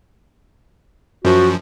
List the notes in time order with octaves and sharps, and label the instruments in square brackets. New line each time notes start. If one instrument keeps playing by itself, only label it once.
[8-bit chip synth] F#2 F3 [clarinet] F#4